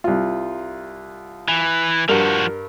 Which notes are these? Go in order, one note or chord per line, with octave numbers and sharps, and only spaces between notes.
C2 F4
E3
G2 F3 F#4 A#4